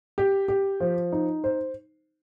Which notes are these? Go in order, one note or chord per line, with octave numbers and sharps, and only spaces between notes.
G4
G4
F3
D#4
C5